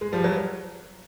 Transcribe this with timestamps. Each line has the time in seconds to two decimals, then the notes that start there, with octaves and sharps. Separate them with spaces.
0.01 G#3
0.13 F3 G3
0.24 F#3